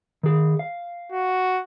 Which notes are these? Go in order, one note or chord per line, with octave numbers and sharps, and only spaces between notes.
D#3 G#4
F5
F#4